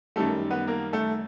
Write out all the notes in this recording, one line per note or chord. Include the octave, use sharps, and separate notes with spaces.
F#2 D#3 G3 A3 A4
B3 B4
A#3 A#4
A3 A4